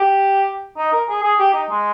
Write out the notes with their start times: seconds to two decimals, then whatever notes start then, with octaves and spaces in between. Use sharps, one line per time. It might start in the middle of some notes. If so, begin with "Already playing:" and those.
Already playing: G4
0.77 D#4
0.92 A#4
1.09 G#4
1.23 G#4
1.39 G4
1.54 D#4
1.70 G#3